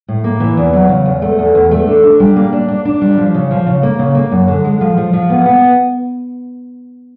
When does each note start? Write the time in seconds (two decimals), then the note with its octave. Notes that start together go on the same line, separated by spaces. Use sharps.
0.08 A2
0.24 A#3
0.40 E3
0.57 E2
0.73 F#3
0.89 C#3
1.06 E2
1.22 A3
1.39 E2
1.55 E2
1.71 A3
1.87 D4
2.03 D4
2.20 G3
2.36 A#3
2.52 D4
2.68 D4
2.85 D4
3.02 G3
3.17 F3
3.34 C#3
3.51 F3
3.66 C#3
3.83 A#3
3.99 C#3
4.15 A#3
4.31 F#2
4.48 D3
4.65 G#3
4.81 F3
4.97 F3
5.13 F3
5.30 B3
5.45 B3